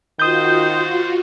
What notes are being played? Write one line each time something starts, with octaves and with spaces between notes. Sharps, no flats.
D#3 F4 F#4 C5 D#6 G6